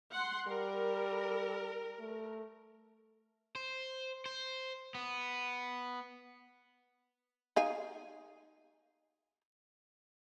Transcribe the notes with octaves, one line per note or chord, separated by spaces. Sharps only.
F#5 C6
G3 A#4
A3
C5
C5
B3
D#4 F5 G#5